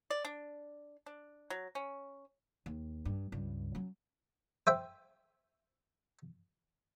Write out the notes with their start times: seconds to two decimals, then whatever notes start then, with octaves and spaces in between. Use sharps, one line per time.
0.10 D5
0.25 D4
1.06 D4
1.50 F#3
1.75 C#4
2.66 D#2
3.05 G2
3.32 C#2 G2
3.75 F#3 C#4
4.67 C5 E5 G5